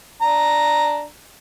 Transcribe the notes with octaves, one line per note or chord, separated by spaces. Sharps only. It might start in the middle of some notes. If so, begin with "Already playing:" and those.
D4 A#5